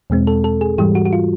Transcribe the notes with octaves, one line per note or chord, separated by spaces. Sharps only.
E2 B2 G#3 C4
A4
A4
G#4
G#2 E3 G3 G4
F#4
F#4
F4